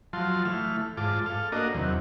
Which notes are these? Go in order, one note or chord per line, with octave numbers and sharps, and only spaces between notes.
F3 F#3 F4 A5 C6
E3 A3 F6
G#2 F4 A5 D6
A4 F5
A#3 D4 F#4 A#4 D#5
E2 C3 D#3 F#3